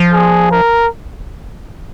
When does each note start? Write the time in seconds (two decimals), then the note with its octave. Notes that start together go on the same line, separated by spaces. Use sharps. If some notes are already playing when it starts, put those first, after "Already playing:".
Already playing: F3
0.12 G#4
0.51 A#4